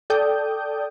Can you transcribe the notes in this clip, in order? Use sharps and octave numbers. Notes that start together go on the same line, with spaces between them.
A4 D5 G5 D#6 G6